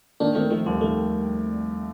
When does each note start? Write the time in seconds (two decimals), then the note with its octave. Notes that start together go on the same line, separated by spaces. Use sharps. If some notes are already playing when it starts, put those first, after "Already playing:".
0.20 D#3 A#3 D4
0.35 D#3 A3 C4
0.50 D#3 F3 A3
0.66 D#2 G3
0.81 D#3 A3